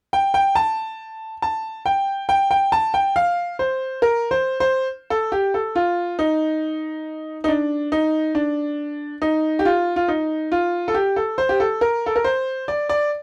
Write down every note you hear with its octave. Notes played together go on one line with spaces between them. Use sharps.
G5
G5
A5
A5
G5
G5
G5
A5
G5
F5
C5
A#4
C5
C5
A4
G4
A4
F4
D#4
D#4
D4
D#4
D4
D#4
G4
F4
F4
D#4
F4
A4
G4
A4
C5
G4
A4
A#4
A4
A#4
C5
D5
D5